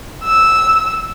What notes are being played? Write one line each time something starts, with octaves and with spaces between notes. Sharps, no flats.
E6